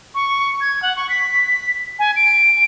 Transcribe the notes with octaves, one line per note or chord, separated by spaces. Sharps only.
C#6
G#6
F#5
C#6
B6
G#5
D7